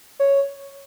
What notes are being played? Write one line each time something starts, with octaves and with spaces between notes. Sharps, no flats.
C#5